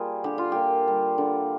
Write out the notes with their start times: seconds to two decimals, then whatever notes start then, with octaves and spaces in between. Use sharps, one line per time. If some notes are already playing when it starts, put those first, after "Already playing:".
Already playing: G3 A#3 F4 G#4
0.24 D3 G4
0.38 F4
0.52 A#3 G4
0.87 G3
1.18 D3